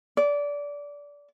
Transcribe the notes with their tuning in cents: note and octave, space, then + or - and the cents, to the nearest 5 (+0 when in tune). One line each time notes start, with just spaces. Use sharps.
D5 -20